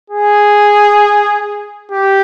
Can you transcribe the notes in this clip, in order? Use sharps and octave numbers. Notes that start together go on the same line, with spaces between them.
G#4
G4